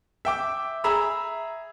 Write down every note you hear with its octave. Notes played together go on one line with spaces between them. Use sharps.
E5 G5 D6
G#4 E5 A#5 B5 E6